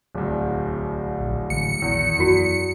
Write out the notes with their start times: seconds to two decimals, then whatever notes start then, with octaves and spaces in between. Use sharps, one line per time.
0.15 D1 C2
1.20 A#1
1.50 A1 D3 G#3 C#7
1.82 A#1 E2 D#3
2.19 F#2 E4 F#4